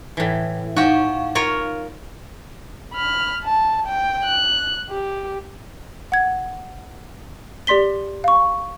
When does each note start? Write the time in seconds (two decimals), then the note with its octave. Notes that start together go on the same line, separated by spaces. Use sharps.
0.17 A2 E3
0.76 D#4 F#4 F5 G5 C#6
1.35 F4 A#4 C#5
2.94 B5 F6
3.44 A5
3.87 G5
4.25 F#6
4.90 G4
6.12 F#5 G#6
7.67 G4 D5 C6 B6 G7
8.24 F5 C#6